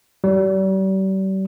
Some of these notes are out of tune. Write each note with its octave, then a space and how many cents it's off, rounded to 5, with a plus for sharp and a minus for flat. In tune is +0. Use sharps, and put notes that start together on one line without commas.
G3 -40